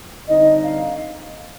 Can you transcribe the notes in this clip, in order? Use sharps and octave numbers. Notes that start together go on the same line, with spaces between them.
D3 G3 C4 D#4 D#5
F5